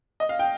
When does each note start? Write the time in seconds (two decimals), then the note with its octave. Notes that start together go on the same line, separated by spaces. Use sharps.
0.20 D#5
0.29 F5
0.39 G5